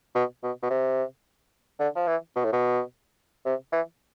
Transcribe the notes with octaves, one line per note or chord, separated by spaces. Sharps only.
B2
B2
B2
C3
D3
F3
E3
B2
A2
B2
C3
E3